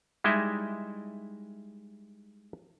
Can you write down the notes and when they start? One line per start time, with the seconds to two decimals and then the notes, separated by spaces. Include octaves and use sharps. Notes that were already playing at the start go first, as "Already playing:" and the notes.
0.24 G3 G#3 D#4 E4 D#5 E5